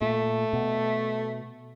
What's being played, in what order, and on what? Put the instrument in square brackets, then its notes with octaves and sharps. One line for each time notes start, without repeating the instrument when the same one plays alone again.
[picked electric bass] A#2 [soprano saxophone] A3
[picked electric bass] B2